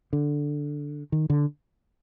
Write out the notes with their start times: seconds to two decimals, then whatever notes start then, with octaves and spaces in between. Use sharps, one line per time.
0.13 D3
1.12 D#3
1.30 D3